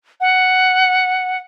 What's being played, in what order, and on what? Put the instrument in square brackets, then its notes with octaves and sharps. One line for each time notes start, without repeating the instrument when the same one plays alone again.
[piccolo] F#5